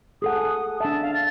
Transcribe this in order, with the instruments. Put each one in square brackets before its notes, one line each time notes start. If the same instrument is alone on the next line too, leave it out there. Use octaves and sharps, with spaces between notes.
[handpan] G#4 A4 F#5 [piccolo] D#6
[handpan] D4 E5 [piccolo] A5
[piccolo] F5
A6